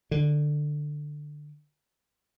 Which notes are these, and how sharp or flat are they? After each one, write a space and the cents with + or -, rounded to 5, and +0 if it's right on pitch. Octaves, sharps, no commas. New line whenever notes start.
D3 +15